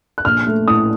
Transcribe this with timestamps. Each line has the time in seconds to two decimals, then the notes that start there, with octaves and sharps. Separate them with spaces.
0.18 F#6
0.25 A#1 F6
0.47 A3
0.68 A2 D#6